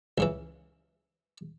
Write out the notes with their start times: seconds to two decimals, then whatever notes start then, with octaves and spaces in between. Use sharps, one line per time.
0.18 C#2 C#3 E3